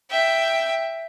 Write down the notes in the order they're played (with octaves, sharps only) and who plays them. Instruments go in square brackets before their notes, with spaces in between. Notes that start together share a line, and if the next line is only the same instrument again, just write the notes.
[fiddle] E5 G5